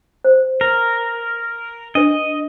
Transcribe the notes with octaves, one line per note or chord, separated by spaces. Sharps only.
C5
A#4
D4 B4 D#5